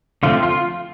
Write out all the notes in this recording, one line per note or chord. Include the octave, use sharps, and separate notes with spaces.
D3 F3 A3 C4 F4
F4